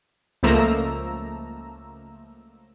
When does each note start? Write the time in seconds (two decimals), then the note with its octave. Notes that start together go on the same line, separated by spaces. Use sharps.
0.43 C#2 F3 A3 A#3 A#5 E6